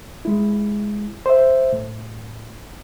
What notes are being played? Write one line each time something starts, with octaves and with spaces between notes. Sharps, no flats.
G#3 E4
C5 E5
A2